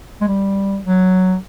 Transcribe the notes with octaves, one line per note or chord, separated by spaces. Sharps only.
G#3
G3
F#3